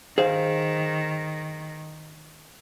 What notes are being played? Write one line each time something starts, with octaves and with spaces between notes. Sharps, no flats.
D#3 G#4 C5 F5